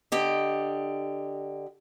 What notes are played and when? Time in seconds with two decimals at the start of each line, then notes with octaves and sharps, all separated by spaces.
0.12 D3 G4 D#5